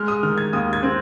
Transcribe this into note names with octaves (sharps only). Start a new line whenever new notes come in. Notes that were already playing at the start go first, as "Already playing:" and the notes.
Already playing: G#3 F6
D#6
D#3 F6
G#6
D#2 D#6
G#6
C4